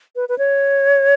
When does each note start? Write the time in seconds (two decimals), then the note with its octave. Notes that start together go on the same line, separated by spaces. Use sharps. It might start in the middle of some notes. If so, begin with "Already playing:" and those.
0.16 B4
0.29 B4
0.38 C#5